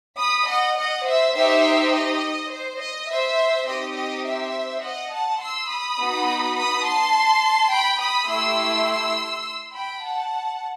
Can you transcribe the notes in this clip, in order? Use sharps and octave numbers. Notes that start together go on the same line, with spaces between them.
B5 D#6
D#5 F#5
D#5 F#5
C5 E5
D#4 G4 C5 E5
D#5
C5
D#5
C5 E5
C4 D#4 G4 D#5
D#5
C5 E5
D#5 F#5
F#5 A5
C6 E6
B5 D#6
B3 D#4 F#4
B5 D#6
A5 C6
G5 B5
B5 D#6
A3 E4 G4 C6 E6
G5 B5
F#5 A5